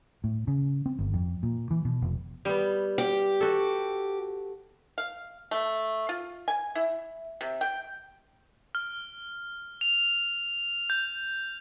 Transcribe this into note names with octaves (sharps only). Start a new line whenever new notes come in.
A2
C#3
C4
G1
F2
A#2
E3
B2
F1
G3 B3
G4
F#4 A4
F5
A3
F4
G#5
E4
C3
G5
F6
F7
G6